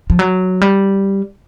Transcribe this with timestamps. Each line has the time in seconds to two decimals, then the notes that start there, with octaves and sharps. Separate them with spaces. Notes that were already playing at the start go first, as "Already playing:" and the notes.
0.10 F3
0.19 F#3
0.61 G3